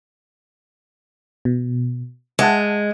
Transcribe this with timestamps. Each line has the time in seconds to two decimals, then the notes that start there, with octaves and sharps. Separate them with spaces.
1.45 B2
2.39 G#3 E5 F#5 A5